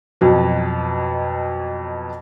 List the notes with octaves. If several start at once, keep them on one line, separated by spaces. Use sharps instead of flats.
F2 B2 F#3